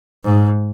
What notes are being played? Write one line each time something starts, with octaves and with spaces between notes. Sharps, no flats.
G#2